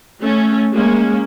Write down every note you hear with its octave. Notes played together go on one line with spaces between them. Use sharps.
A3 C#4
G#3 A#3 C#4